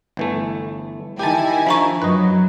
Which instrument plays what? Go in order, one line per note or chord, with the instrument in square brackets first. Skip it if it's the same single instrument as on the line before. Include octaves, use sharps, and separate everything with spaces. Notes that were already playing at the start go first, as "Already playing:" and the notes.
[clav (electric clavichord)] G1 E3 A3
[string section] D#3 E4 G#5 [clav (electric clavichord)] G4 A5
[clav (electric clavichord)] F3 [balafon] D4 A#5 C#6
[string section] F#2 F#3 [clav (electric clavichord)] B4 D#5